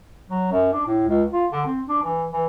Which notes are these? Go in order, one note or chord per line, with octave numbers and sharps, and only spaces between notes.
F#3
F#2
D4
A2
C#2
F4
D3
C4
D4
E3
E3